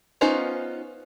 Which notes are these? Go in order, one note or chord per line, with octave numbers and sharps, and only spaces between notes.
B3 C#4 D#4 F4 C5